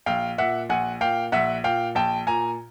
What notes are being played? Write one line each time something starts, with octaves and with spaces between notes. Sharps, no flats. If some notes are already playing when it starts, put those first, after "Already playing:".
A#1 F5 G5
A#2 E5 F#5
A#1 F#5 G#5
A#2 F5 G5
A#1 E5 F#5
A#2 F5 G5
A#1 G5 A5
A#2 G#5 A#5